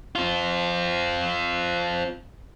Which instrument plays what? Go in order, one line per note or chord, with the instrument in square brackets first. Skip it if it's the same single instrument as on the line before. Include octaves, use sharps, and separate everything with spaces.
[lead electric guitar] C4 F4